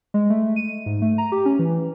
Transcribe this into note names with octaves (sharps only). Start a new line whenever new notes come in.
G#3
A3
D#7
G#2
A3
A#5
G4
C#4
E3